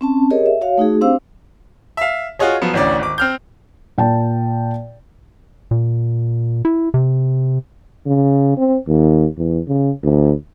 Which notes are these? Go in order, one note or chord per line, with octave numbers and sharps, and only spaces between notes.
C4 C#4 A5
G4 G#4 A#4 C#5 D#5
E5
F#4 C#5 F5
A3 D#4 F#4 G#4
C4 D4 G4 C5 F5 E6
E5 F5
F4 F#4 G#4 C#5 D#5
F3 F#3 B3
A1 D2 C#4 D4 D5
G#1 D6
C4 F6 G6
A#2 G5 A5
A#2
E4
C3
C#3
C4
D#2
E2
C#3
D2